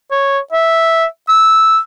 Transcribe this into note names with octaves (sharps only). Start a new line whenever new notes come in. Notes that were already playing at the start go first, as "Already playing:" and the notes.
C#5
E5
E6